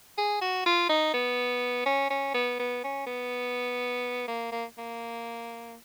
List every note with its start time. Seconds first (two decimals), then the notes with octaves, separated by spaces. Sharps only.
0.18 G#4
0.42 F#4
0.66 F4
0.89 D#4
1.14 B3
1.86 C#4
2.10 C#4
2.34 B3
2.59 B3
2.84 C#4
3.07 B3
4.28 A#3
4.52 A#3
4.78 A#3